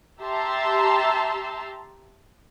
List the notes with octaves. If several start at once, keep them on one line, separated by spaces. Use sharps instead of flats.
G4 E5 A5 A#5 C6 E6